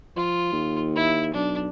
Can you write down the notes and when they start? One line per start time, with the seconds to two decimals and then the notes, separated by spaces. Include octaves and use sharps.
0.16 F3 F4
0.52 D#2
0.95 E4
1.34 B1 D4